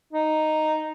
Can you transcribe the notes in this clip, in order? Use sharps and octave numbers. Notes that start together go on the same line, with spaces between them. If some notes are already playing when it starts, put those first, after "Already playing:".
D#4